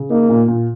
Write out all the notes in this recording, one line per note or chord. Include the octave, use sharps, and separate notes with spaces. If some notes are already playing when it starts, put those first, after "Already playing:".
Already playing: C#3
A#3 D#4
A#2
A#2